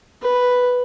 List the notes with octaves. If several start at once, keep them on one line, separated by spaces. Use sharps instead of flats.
B4